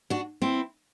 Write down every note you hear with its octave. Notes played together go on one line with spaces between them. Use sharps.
D4 F#4
C4 E4